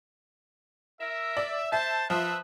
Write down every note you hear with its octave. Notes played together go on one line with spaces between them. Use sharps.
A#4 E5
D5
C5 E5 A5
F3 B4 C5 E5